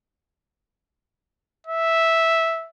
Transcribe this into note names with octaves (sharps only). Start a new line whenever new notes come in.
E5